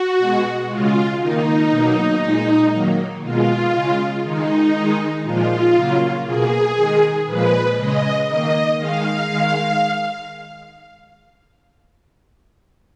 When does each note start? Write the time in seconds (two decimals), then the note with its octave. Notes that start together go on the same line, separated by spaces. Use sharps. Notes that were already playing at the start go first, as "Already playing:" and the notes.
Already playing: F#4
0.18 B2 G#3
0.69 C#3 G#3 F4
1.19 D#3 A#3 D#4
1.70 B2 F#3 A#3
2.21 A#2 G#3
2.72 D#3 F#3 A#3
3.22 B2 G#3 F4
3.73 C#3 G#3
4.23 D#3 G#3 D#4
4.74 D#3 G#3
5.24 A#2 F3 G#3 F4
5.75 C#3 F#3 A#3
6.25 B2 A#3 G#4
6.76 D#3 G#3
7.26 A#2 F3 G#3 B4
7.77 C#3 G#3 D#5
8.28 D#3 A#3 D#5
8.78 D#3 G#3 F5
9.29 D#3 G#3